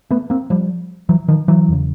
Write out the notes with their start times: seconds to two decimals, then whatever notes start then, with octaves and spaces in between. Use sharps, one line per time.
0.11 A3 B3
0.30 A#3 C4
0.50 F3 G3
1.09 E3 F#3
1.28 D#3 F3
1.48 E3 F#3
1.68 E2 C#3